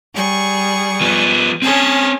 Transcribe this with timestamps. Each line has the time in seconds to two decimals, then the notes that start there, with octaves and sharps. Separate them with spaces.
0.14 G3 G#4 C#6
1.01 F3 B3
1.62 C4 C#4 G#4 C#5 A5